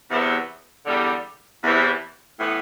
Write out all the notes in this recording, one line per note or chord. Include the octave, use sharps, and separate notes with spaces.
E2 C3 F#3 B3 E4
E2 D3 G3
E2 C3 E3
A2 E3 B3